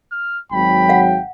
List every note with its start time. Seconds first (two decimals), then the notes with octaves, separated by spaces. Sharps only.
0.12 F6
0.52 G#1 F#3 G5 B5
0.89 F5 F#5